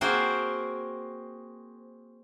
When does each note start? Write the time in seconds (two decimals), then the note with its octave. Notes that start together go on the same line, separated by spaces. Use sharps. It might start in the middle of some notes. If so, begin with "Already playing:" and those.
0.01 A#3 C4 F#4 G#4 A#4 C5